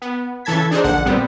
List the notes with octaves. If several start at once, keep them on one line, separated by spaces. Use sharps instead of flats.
B3
C#3 E3 A4 A5 G#6 B6
D4 D#4 G#4 C5
A#1 D3 F#5
A#2 G3 B3 C4